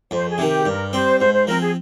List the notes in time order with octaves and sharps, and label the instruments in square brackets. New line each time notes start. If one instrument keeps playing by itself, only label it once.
[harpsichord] F2 [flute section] C5
[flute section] G#4
[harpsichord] C3 D#3
[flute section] G4
G#4
[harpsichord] G2 [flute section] A#4
[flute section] A#4
[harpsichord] G3 C4 [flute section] C5
[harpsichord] G#2 [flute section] C5
[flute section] C5
[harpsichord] F3 C4 [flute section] A#4
[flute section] G#4